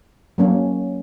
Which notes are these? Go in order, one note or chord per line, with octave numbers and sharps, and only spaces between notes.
F#3 A#3 C#4